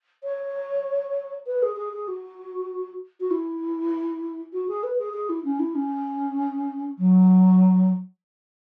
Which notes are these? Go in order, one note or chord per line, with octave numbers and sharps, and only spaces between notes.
C#5
B4
G#4
G#4
G#4
F#4
F#4
E4
F#4
G#4
B4
G#4
G#4
E4
C#4
E4
C#4
F#3